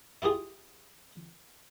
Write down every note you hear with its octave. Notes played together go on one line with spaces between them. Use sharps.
E4 F4 G4 G#4